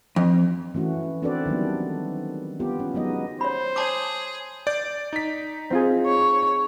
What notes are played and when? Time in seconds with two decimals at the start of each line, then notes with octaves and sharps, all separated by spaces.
0.16 F2
0.74 E3 A3 C#4 F#4
1.22 C4 D4 F#4 A4 B4 D5
1.46 D#3 F#3 G3 B3
2.60 B3 F4 G4
2.80 C#4
2.95 F#3 G#3 B3 D#4 D#5
3.41 C5 C#5 B5
3.76 G#4 C#5 A5 D6
4.67 D5 G6
5.13 D#4 B6
5.70 C4 F4 G#4
6.06 C#5